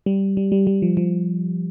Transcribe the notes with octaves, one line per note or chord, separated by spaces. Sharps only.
G3
G3
G3
G3
F3
F3